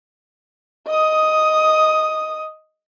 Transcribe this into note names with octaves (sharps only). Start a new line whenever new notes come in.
D#5 D#6